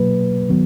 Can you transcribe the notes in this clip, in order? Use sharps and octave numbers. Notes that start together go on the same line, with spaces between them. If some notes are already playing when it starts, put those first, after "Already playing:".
Already playing: B2 F#3 A#3 B4
D#3 F#3 B3